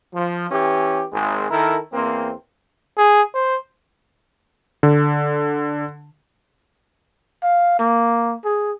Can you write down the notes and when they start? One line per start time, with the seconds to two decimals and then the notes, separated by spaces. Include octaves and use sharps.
0.14 F3
0.50 E3 C#4 G4
1.12 G#1 G#3
1.50 D#3 E4 A4 A#4
1.93 E2 A#3 C4
2.98 G#4
3.34 C5
4.83 D3
7.43 F5
7.79 A#3
8.45 G#4